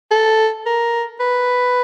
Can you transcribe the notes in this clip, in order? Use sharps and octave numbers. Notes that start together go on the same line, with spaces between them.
A4
A#4
B4